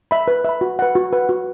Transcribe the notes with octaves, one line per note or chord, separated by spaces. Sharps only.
E5 B5
B4
E5 B5
F#4
B4 F#5
F#4
B4 F#5
F#4